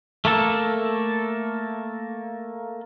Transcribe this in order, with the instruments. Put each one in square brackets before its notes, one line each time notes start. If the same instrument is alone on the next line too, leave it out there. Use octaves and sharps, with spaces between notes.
[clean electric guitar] A3 A#3 A4